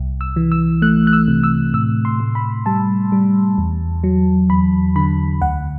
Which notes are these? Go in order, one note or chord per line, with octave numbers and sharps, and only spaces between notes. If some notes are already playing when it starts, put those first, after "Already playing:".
Already playing: C2
E6
E3
E6
A3 F#6
F#6
E6
C3
E6
A2 E6
C6
A2
B5
G3 A5
G3
E2
F#3
E2 B5
D3 B5
D2 F#5